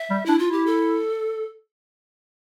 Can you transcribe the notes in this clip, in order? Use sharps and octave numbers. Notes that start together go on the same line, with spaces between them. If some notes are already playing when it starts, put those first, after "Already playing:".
Already playing: E5
G3
D4 E4
F4
E4 G4
A4